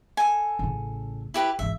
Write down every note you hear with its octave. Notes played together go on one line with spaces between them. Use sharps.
A4 G#5
A1 C#3
E4 G4 B4
G#1 E3 E5